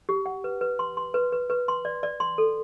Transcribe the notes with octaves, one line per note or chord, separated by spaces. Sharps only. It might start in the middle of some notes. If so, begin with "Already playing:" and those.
G4
F#5
B4
B4
C6
C6
B4
B4
B4
C6
D5
D5
C6
A4